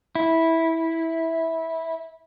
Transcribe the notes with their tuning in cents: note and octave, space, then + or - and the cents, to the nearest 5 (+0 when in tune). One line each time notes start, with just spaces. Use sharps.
E4 -15